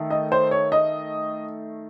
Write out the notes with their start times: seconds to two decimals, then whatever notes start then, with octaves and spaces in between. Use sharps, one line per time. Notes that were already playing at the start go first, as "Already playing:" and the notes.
Already playing: D#3 A3
0.10 D#5
0.32 C5
0.51 C#5
0.72 D#5